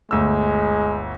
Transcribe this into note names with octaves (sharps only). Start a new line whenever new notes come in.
G1 D2 G#3 E6